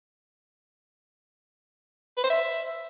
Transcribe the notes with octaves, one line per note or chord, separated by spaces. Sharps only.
B4
C5
E5